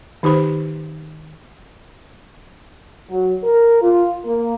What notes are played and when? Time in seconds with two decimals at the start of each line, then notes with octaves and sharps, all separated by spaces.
0.23 D#3 D#4 G4 C5 B5
3.10 F#3
3.44 A#4
3.82 F4
4.25 A#3